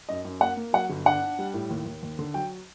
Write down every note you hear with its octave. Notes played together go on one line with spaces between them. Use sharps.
F#2 D#5
F#2
A#3 F#5
A#3
F#3 F#5
G1
D4 F#5
D4
G3
A2
D#2
D#2
D#2
D3
F#3 G5